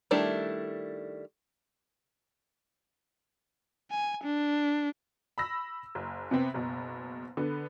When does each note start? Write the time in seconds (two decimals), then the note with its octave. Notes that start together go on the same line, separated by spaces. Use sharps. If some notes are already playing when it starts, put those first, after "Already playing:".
0.11 D#3 G3 A3 D4 E4
3.91 G#5
4.23 D4
5.38 B5 E6 A#6
5.95 F#1
6.31 C3 B3 C4
6.54 F#1 B2
7.37 D3 B3